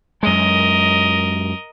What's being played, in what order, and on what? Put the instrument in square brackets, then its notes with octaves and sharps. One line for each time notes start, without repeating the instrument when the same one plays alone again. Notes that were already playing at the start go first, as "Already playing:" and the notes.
[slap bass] F#2 G#3 [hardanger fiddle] A#4 D#5